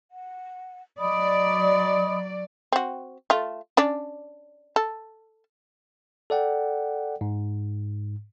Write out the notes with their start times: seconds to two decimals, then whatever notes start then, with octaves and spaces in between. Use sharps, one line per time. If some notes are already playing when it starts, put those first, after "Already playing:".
0.12 F#5
0.98 F#3 D5 D#5 B5 D#6
2.72 C4 F#4
3.30 A3 F4
3.77 C#4 D4 D5
4.76 A4
6.30 A4 D5 F#5 G5
7.21 G#2